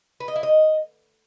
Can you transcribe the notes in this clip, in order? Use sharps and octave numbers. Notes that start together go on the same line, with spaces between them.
B4
D#5
E4
D#5